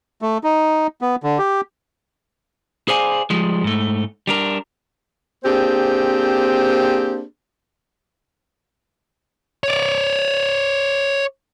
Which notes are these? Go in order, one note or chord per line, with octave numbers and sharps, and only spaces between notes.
A3
D#4
B3
D3
G4
G#4 C5 D5 F5 G#5
F3 G3 G#3
G#2 A3
G3 D4 A#4
A#3 C4 D4 G4 G#4 C5
C#5 D5